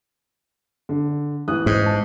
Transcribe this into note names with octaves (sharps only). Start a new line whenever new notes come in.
D3
A1 D#6 F#6
G#2
A5